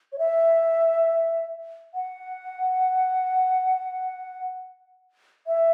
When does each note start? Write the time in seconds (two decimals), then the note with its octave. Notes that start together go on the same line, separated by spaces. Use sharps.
0.12 C#5
0.18 E5
1.94 F#5
5.47 E5